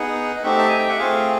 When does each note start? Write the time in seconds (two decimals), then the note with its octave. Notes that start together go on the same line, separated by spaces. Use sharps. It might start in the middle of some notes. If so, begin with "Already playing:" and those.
Already playing: B3 D#4 G#4 F#5
0.36 D#5
0.43 A3 C4 D#4 G4 E5
0.59 A5
0.69 G#5
0.79 G5
0.89 F#5
0.99 A3 C4 F4 G#4 F5